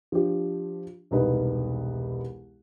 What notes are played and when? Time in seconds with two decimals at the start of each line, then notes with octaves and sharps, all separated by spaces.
0.12 F3 D4 G4
1.11 E1 C2 D#4 B4